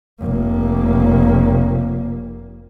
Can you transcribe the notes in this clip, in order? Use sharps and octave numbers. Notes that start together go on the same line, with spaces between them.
F1 A#3